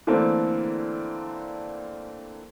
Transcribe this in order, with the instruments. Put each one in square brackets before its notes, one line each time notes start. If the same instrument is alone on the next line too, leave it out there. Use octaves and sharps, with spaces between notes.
[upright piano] D3 E3 A3 A#3 C4 D4